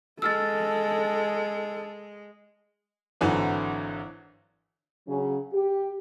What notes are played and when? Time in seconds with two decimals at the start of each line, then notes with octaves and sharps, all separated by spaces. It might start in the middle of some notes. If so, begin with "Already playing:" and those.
0.22 G#3 A4 E6 F6 A6
3.21 G#1 D3 E3 F#3
5.08 C#3 F#3 C#4
5.54 G4